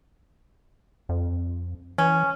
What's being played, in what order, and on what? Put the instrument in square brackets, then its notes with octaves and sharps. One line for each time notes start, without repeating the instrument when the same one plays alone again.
[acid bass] F2
[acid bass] E3 [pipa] C#4